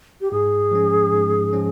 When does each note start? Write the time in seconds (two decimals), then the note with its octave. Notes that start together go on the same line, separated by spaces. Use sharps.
0.21 G4
0.31 G#2 G#4
0.71 F3 G#3 C#4
1.12 G#2
1.53 F3 G#3 C#4